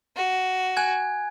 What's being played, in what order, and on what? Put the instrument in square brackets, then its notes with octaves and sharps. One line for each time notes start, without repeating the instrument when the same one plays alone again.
[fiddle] F#4
[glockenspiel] G#5 F#6 G#6